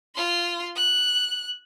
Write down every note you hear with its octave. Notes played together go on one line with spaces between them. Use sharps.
F4 C6
F#6